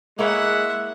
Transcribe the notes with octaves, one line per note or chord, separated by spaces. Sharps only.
G#3 A#3 E4 C#5 E5 F#5